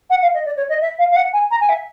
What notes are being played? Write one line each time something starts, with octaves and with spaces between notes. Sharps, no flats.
F#5
F5
D#5
D5
C#5
D#5
E5
F5
F5
F#5
G#5
A#5
G#5
E5